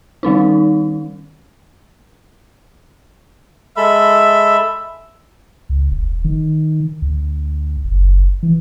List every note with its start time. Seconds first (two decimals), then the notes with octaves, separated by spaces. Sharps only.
0.23 D#3 G3 C#4 D#4
3.77 G#3 A4 E5 B5
5.69 C#2
5.91 E1
6.24 D#3
7.02 D2
7.84 F#1
8.43 E3